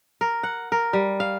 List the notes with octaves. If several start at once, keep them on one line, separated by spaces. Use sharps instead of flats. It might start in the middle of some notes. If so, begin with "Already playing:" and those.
A#4
F#5
A#4
G3
F5